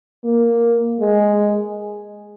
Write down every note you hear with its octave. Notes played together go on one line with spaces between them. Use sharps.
A#3
G#3